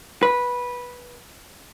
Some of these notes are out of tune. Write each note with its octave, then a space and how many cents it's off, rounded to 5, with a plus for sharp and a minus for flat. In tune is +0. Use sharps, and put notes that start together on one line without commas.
B4 -10